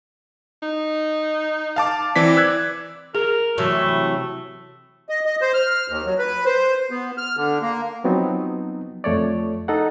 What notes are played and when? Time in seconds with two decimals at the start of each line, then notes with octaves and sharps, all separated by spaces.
0.62 D#4
1.76 F5 A5 D6
2.16 E3 C4 D5 B6
2.37 E6 F#6 G#6
3.15 G#4 A#4
3.58 C3 E3 F#3 A3
5.09 D#5
5.25 D#5
5.41 C5
5.54 F6
5.89 D#2
6.06 F#3
6.19 B4
6.45 C5
6.91 B3
7.18 F6
7.37 D3
7.62 A#3
8.04 F3 F#3 B3 C4 D#4
9.04 F2 A3 C#5 D5
9.68 D#4 A4 F#5